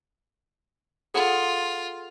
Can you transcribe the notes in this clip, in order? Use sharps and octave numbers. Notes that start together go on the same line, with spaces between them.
F4 G#4 A4 F#5